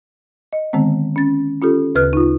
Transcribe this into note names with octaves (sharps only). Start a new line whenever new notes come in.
D#5
D3 D#3 G#3 B3 C4
C#4 A6
C#4 F4 G4 A4
D2 C#3 B4 F6 F#6
D#4 F4